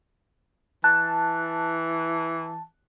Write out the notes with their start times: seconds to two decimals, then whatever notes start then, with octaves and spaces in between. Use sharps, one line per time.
0.84 E3 A5 F#6